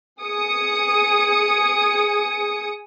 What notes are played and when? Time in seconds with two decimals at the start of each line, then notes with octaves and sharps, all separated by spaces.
0.21 G#4 D#6 C#7